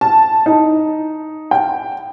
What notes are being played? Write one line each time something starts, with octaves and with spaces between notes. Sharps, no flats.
A5
D#4
G5